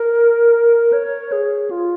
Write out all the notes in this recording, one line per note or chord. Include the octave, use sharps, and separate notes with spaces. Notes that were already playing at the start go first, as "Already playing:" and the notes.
Already playing: A#4
C#5
G#4
F4